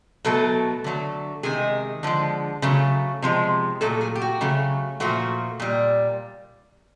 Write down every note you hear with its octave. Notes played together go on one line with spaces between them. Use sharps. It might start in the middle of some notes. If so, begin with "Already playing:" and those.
B2 F#3 A3 A4
D3 F#3 A3
C3 D#3 G#3 G#4
D3 F3 G#3
C#3 F#3 A3
C3 F3 G#3
A#2 F#3 A3 A4
G#4
G4
F#4
C#3 F#3 A3
A#2 F3 A3 F#4
A#2 G3